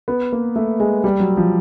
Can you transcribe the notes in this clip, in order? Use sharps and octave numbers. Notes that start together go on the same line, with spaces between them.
B3
A#3
A3
G#3
G3
F#3
F3